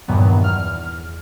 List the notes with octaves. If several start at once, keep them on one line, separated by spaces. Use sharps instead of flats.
E2 G2 A#2 D#3 F#3 B3
E2 F6